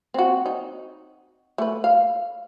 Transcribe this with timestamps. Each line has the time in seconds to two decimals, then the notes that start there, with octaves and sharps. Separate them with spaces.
0.14 C4 F#4
0.46 D#4
1.58 A3 B4
1.84 F5